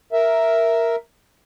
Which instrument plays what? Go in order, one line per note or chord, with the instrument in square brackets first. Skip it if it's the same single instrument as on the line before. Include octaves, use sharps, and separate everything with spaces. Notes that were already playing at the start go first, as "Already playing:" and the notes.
[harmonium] A#4 E5